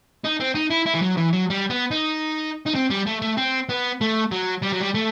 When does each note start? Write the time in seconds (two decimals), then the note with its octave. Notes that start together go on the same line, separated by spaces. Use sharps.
0.24 D#4
0.40 C4
0.55 D#4
0.71 E4
0.86 E4
0.95 E3
1.02 F#3
1.18 E3
1.33 F#3
1.50 G3
1.70 B3
1.91 D#4
2.66 D#4
2.75 C4
2.91 G3
3.06 A3
3.22 A3
3.37 C4
3.69 B3
4.01 A3
4.32 F#3
4.63 G3
4.73 F#3
4.81 G3
4.95 A3